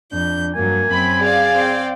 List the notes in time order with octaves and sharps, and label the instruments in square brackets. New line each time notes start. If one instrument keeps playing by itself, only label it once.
[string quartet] F2 G6 [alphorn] D4
[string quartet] G2 F#3 [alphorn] A#3 [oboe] G#5
[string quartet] F#2 C4 [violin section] B5
[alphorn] G#4 [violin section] D5 F5
[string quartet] C4 G5